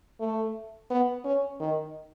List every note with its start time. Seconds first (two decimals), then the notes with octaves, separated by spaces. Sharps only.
0.20 A3
0.91 B3
1.25 C#4
1.60 D#3